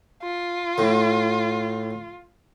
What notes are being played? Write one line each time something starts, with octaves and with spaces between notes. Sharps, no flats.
F4
A2